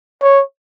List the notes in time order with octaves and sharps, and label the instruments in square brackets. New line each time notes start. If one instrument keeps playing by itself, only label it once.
[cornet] C#5